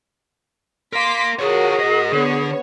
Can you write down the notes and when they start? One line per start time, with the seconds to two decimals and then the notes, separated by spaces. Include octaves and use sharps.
0.93 A#4 F5 C6 D6 B6
1.39 F4 F#4 G#4 A#4 C#5
1.80 G#2 D#5
2.12 D3 B3 C#5